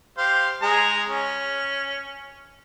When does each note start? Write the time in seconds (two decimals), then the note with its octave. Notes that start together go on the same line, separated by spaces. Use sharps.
0.18 G4 C5 F5
0.62 G#3 G#4 A#5
1.08 C#4